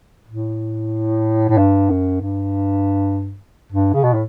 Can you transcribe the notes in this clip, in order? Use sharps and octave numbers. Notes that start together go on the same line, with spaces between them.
A2
A2
G2
F#2
G2
G2
C#3
B2
A2